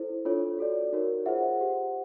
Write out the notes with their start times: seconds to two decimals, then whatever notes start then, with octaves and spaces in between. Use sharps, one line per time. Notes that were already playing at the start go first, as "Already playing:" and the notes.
Already playing: E4 A4 C5
0.25 D4 F4 A4 C#5
0.59 F#4 A4 D5
0.93 D#4 F#4 A#4 C#5
1.26 F4 G#4 C5 E5 F#5
1.59 G4 C5